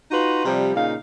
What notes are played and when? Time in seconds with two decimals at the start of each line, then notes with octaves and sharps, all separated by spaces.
0.11 D#4 F4 F#4 B4
0.45 C3 F3 G3
0.75 A#2 C#3 D#4 F5